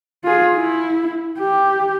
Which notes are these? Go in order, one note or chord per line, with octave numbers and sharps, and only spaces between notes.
F4 G#4
E4
G4